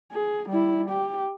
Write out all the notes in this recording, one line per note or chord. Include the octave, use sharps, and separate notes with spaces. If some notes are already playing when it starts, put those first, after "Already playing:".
G#4
G3 E4
G4